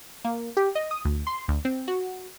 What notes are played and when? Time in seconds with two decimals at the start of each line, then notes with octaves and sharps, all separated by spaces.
0.25 A#3
0.57 G4
0.75 D#5
0.91 D#6
1.05 D2
1.27 C6
1.48 D2
1.65 C4
1.88 F#4